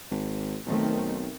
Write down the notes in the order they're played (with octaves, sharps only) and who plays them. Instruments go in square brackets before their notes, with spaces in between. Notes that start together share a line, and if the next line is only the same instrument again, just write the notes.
[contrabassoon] G#1
[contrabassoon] B1 [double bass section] D#3 A3 C4